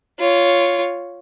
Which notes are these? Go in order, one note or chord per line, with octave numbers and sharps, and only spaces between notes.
F4 C#5